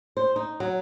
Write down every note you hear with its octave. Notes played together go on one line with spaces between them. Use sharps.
C5
D#4
F#3